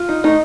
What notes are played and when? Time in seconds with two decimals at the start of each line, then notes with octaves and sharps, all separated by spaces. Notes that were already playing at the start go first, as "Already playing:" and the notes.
Already playing: F4
0.09 D#4
0.24 A3 D#4